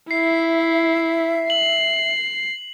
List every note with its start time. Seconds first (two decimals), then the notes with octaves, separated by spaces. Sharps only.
0.11 E4 E5 C7
1.50 C7 F#7